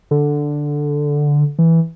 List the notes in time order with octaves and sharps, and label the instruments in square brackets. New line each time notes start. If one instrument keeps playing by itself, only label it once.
[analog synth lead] D3
E3